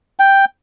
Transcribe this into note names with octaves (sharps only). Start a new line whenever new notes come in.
G5